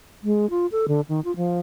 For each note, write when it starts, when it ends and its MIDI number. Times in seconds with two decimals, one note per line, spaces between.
0.23 0.49 56
0.50 0.67 65
0.72 0.86 69
0.88 1.01 50
1.09 1.20 51
1.25 1.35 65
1.36 1.60 53